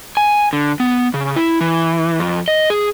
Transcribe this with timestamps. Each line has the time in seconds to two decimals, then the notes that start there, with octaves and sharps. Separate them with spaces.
0.17 G#5
0.53 D3
0.80 B3
1.14 C#3
1.36 E4
1.61 E3
2.20 F2
2.48 D#5
2.70 G#4